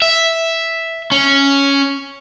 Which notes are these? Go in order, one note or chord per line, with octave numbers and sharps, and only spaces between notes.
E5
C#4